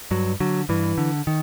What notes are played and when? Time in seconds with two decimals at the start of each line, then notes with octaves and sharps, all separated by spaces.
0.11 G2 F#3
0.40 D3 F#3
0.69 G2 E3
0.98 D3
1.27 D#3